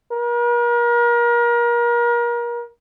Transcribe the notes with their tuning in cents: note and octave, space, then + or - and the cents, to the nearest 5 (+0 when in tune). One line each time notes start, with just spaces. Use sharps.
A#4 +35